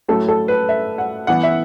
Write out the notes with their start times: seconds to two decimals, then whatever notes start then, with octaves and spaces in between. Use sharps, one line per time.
0.08 A2 F#3 A3 A4
0.28 A4
0.48 B4
0.69 E5
0.98 F#5
1.27 E3 B3 F#5
1.43 E5